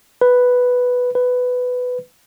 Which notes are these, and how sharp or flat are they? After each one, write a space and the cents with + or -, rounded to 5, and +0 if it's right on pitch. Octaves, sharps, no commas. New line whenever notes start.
B4 +0
B4 +10